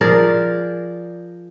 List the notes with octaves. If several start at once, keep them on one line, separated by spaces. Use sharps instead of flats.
F3 G#4 A#4 D5